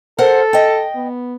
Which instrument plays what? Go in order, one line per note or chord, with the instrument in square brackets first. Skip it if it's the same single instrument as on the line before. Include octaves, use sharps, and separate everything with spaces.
[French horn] A4 [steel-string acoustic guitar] A#4 C5 F#5
[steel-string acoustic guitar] D#5 G5
[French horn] B3